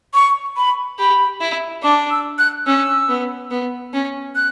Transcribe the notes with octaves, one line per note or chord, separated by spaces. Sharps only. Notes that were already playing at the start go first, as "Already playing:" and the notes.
C#6
B5
G4 B5
E4
D4 D6
E6
F#6
C#4 E6
B3
B3
C#4
F#6